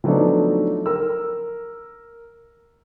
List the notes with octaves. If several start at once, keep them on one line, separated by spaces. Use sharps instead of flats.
F3 F#3 A3 B3 D4 D#4
A#4 E6